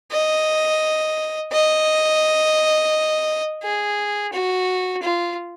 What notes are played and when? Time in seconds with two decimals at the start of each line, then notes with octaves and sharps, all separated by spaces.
0.12 D#5
1.52 D#5
3.63 G#4
4.33 F#4
5.02 F4